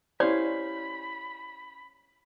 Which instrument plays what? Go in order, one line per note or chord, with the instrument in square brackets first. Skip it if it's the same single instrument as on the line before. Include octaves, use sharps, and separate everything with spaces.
[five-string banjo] C#4 C5 F5 [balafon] E4 G4 [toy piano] D5 [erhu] B5